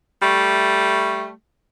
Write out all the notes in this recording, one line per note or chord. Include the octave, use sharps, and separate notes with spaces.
G3 A3